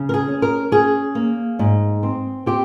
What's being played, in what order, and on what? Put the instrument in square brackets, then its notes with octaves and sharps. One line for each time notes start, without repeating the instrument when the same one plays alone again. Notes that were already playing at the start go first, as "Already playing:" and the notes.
Already playing: [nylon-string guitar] C#3
A#4
G#4
C#4
A#4
C#4 G#4
A#3
G#2
C4
C4 G4